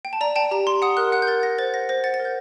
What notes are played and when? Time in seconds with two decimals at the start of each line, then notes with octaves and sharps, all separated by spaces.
0.05 G5
0.13 A5
0.21 D5 A#5
0.36 G5 A5
0.51 G4 A#5
0.67 G4 C6
0.82 F#5 D#6
0.97 A#4 F#6
1.12 F#5 F#6
1.22 G6
1.27 A#4 A6
1.43 F#5 A#6
1.58 C5 A6
1.74 F#5 A#6
1.89 C5 A#6
2.04 F#5 A6
2.14 A6
2.20 A#4
2.25 G6